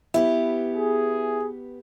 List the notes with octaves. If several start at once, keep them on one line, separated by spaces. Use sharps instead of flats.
B3 E4 G4 B4
G#4